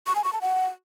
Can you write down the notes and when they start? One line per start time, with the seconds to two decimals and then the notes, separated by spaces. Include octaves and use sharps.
0.07 C#6
0.15 G#5
0.24 C#6
0.33 A5
0.41 F#5